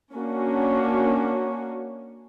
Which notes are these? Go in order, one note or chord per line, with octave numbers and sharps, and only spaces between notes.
A#3 C#4 D4 F#4